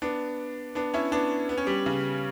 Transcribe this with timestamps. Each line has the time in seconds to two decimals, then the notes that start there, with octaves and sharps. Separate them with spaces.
0.02 B3 D4
0.75 B3 D4
0.94 C#4 E4
1.12 B3 D4
1.49 B3
1.57 C#4
1.66 G3 B3
1.86 C#3